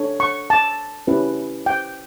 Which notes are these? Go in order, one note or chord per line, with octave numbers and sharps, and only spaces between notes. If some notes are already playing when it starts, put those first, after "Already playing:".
Already playing: D4 A4 C#5
C#6
A5
C#4 E4 G4 B4
G5